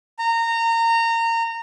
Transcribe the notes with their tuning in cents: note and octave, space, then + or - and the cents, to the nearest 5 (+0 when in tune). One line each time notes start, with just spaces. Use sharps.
A#5 -25